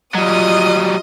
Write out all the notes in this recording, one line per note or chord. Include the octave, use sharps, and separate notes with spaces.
F#3 G3 F4 D#5 D#6